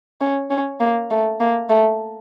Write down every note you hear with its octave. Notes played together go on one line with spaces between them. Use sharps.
C#4
C#4
A#3
A3
A#3
A3